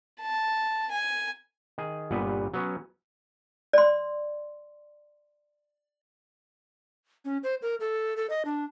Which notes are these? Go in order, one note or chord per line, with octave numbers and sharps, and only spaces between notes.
A5
G#5
D#3 G#4
G1 A#2 G3 B3 B4
F#3 B3 C#4
D5 C6
C#4
C5
A#4
A4
A4
D#5
D4